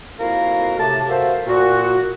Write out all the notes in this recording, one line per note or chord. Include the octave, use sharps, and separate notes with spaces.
F2 A#3 E4 F#4 A#4 F5
A2 C3 A5
F#4 A4 A#4 C5 E5 F5
A#2 F#4